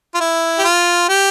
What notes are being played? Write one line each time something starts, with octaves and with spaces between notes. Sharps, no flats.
F4
E4
G4
F4
G4